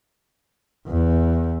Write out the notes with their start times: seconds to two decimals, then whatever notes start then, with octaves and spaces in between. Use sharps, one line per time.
0.87 E2